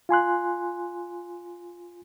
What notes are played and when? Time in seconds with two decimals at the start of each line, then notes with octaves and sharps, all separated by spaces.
0.09 F4 G#5 C6 F#6